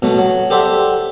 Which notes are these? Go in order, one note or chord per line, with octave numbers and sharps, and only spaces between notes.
B2 F#3 A3
F#3
G4 A4 C5 D5 E5 F#5